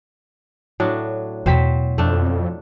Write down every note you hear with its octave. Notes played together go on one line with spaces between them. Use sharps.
A2 F#3 D4
E2 B2 F#3 C5 G5 B6
F2 A3 D4